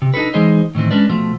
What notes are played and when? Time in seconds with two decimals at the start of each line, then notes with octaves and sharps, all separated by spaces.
0.02 C3
0.14 D4 D#4 F#4 A4 B4
0.34 E3 G#3 D#4 G#4 C5 D#5
0.75 A2 D#3 E3 C4
0.91 G#3 C#4 D4 B4 D5
1.10 B2 F3 A3